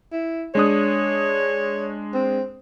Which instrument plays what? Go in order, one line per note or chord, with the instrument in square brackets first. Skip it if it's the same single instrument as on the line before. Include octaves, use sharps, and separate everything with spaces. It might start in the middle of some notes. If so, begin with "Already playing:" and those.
[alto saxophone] E4
[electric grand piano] G#3 D4 D#6 [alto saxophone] C#5
[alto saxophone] C4